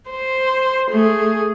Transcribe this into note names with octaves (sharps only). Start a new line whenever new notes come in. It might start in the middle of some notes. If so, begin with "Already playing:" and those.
C5
A3 G#4